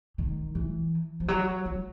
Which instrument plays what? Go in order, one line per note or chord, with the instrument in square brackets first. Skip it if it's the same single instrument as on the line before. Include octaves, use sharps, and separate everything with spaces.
[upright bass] D#3
E3
F3
F#3
F#3